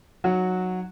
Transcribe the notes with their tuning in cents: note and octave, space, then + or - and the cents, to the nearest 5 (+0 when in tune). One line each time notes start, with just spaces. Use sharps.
F#3 -10 D#4 -5 F#4 -10